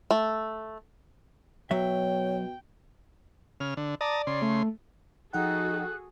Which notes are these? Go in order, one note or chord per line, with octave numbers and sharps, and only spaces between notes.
A3
B2 F#3 C#5 E5 G5
C#3 F6
D3
D5 A5 A#5 D#6
C#3 C6
A3
F3 D#4 F#4 G#4 A4 F#5 G5 F#6